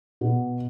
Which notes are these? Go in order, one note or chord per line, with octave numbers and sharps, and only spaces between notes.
B2